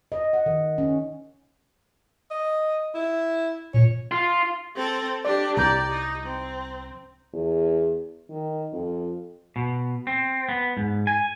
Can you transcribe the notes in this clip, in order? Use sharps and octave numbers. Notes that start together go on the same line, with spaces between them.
D#5
F#5
D#3
C#4
D#5
E4
A#2 C#5
F4
C4 A4
D4 G4 D5
C2 G4 D5 A#5 G6
D#4
C4
E2
D#3
F2
B2
C4
B3
G#2
G#5